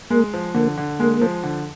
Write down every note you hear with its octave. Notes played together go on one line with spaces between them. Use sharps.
G#3 A#3
F3
D3 A#3
D3
G#3 A#3
F3
D3